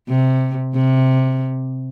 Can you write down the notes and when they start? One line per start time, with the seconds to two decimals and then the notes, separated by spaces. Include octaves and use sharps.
0.09 C3
0.74 C3